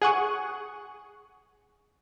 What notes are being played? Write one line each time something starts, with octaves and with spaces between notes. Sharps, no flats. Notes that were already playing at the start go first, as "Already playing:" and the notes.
G#4 F#5 C#6 D#6